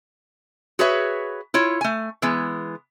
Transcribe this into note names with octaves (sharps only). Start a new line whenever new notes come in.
F#4 G#4 B4 C#5 E5
E4 F4 C#5
A3 G#5
E3 G#3 B3